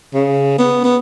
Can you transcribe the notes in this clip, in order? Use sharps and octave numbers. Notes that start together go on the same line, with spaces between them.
C#3
B3
B3